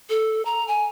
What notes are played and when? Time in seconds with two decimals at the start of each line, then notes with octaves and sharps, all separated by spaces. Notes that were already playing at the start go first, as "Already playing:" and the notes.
0.10 A4
0.45 A#5
0.68 G#5